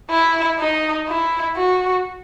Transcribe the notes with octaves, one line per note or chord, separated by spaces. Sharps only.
E4
D#4
E4
F#4